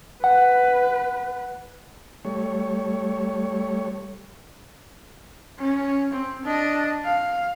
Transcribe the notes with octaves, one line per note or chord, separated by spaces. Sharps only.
B4 F#5
G3 A3 C#5
C#4
C4
D4 D#5
F5